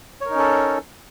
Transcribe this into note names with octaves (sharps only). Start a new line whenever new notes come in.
C#4 D#4 A4 A#4 C#5